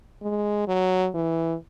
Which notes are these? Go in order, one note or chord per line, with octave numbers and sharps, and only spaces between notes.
G#3
F#3
E3